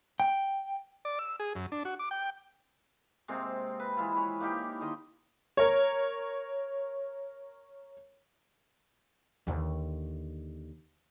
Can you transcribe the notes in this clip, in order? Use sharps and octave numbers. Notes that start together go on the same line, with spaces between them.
G5
D5
E6
G#4
F#2
D4
F#4
D6
G5
C3 G#3 A#3 C4
B4
E3 G#3 E4 F4
C#5
A#3 D#4 E4 G4
D#3 F4 D#5 C6
A#4 C#5
D#2 D3